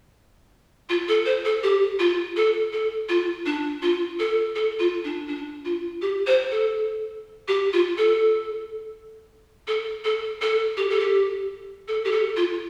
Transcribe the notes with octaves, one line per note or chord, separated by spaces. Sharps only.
F4
A4
C5
A4
G4
F4
A4
A4
F4
D4
F4
A4
A4
F4
D4
D4
F4
G4
C5
A4
G4
F4
A4
A4
A4
A4
G4
A4
G4
A4
G4
A4
F4